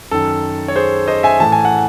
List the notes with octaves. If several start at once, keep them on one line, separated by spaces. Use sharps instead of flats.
F#2 D#3 A4
C#5
G#4 C5
C5 D#5
E5 G#5
A2 E3 A5
G#5
F#5